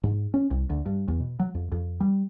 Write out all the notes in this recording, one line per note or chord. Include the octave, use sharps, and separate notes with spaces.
G#2
C#4
C2
D2
G2
E2
B2
F#3
F2
F2
G3